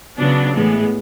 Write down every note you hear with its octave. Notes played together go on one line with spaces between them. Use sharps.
C#3 F#3 B3 D4
A2 E3 G#3 B3